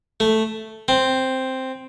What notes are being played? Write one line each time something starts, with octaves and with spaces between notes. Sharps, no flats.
A3
C4